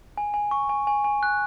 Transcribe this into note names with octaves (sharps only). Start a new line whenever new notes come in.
G#5
G#5
C#6
G#5
G#5
G#5
F#6